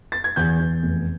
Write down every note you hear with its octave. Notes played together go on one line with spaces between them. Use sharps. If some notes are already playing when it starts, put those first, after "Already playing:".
A6
G#6
E2 G6
E2
F1